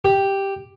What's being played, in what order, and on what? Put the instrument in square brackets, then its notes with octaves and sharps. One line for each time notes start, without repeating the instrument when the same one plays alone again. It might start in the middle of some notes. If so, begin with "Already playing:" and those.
[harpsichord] G4